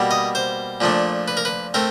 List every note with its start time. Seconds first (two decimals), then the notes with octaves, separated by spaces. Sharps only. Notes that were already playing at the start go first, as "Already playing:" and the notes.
Already playing: B2 G3 A#3
0.11 D#5
0.35 C5
0.81 A#2 F3 A3 D4
1.28 B4
1.37 A#4
1.45 B4
1.74 A3 C4 A#4